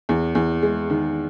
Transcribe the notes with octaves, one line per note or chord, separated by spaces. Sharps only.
E2
E2
G#3
D#3